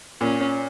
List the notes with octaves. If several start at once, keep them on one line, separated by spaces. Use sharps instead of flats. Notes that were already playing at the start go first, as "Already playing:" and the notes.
A#2 C#4